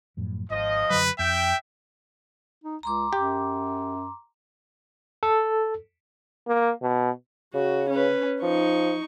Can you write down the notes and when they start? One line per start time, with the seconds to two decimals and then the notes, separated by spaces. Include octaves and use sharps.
0.17 F#2 A2 F3
0.50 G#1 F3 D#5
0.90 F#2 D3 F#3 B4
1.19 F2 E5 G5
2.64 D#4
2.83 C#2 A#5 C6 D6
3.13 F#2 G4
5.23 A4
6.47 A#3
6.82 B2
7.54 C#3 F#4
7.90 C#4 B4
8.42 F3 D#4 C#6